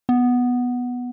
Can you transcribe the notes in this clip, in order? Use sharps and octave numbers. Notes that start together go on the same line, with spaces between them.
B3